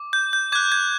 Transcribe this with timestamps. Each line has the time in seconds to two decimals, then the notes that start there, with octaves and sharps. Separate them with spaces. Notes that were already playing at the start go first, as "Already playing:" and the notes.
Already playing: D6
0.13 G6
0.33 G6
0.52 D6 F#6 G#6
0.72 G#6